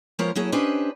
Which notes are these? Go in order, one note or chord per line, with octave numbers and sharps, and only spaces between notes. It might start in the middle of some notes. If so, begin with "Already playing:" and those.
F3 G#3 B3 A#4 C5 C#5
F#3 A#3 C#4 E4 G#4 A4
C#4 D4 G4 B4 C5 D#5